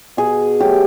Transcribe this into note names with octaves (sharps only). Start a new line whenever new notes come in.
B2 G#4
F#3 A3 G4